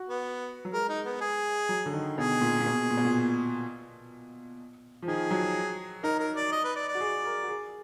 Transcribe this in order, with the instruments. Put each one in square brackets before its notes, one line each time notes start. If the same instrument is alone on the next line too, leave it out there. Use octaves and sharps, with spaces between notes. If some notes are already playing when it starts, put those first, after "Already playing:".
Already playing: [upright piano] F#4
[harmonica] B3
[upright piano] F#3
[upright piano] G#3 [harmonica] A#4
[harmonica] D#4
B3
G#4
[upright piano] F#3
D3
D#3
[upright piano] B2 [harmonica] G#4
[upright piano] A#2
A#2
B2
A#2
B2
A#2
F3
[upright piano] D#3 [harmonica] G#4
[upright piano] F#3
[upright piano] D#4 [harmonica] A#4
[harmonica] A#4
D5
D#5
B4
D5
D5
[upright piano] F#4
G#4
A#4
F#4
G#4